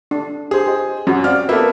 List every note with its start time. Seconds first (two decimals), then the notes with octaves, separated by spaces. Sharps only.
0.11 D4
0.51 G4 G#4 C5
0.67 G4 C5 D#5
1.07 F#2 C#4 F#4
1.24 C4 F#4 D5 F5 F6
1.49 A#3 B3 A4 E5